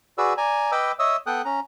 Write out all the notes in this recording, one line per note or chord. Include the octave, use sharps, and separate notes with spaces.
F#4 G#4 B4 D5 E6
D5 G#5 A#5
B4 D#5 G5 B5 D6 E6
C#5 D#5 E5 D#6 E6
B3 A4 G5 D#6 F#6
C#4 A#5